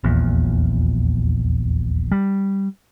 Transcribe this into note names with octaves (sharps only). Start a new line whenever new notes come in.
D#1 A#1 E2 A#2
G3